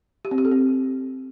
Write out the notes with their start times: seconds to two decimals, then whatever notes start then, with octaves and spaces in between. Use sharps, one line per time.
0.25 G4
0.31 C4
0.38 G4
0.45 A4
0.51 C4